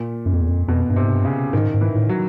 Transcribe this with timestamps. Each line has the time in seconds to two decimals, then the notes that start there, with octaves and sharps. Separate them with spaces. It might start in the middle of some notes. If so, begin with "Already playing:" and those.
Already playing: A#2
0.26 F#2
0.33 F2
0.41 E2
0.49 F2
0.68 F2 B2
0.90 G2
0.96 C3
1.04 G#2
1.11 G2
1.25 C#3
1.53 G#2 D#3
1.74 G#2
1.81 E3
1.95 A2
2.09 F#3